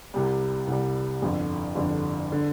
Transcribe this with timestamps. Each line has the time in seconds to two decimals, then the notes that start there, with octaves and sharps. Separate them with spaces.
0.14 C2 C3 G3
0.67 C2 C3 G3
1.22 G1 F2 D3
1.75 G1 F2 D3
2.32 D3